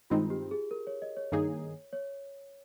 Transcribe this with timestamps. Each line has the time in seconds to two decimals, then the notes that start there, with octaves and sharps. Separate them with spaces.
0.10 G2 D#3 G#3 C4 D#4 F4
0.30 G4
0.51 G#4
0.71 A#4
0.87 C#5
1.02 D#5
1.17 C#5
1.32 G2 D#3 A#3 D#4 G#4
1.93 C#5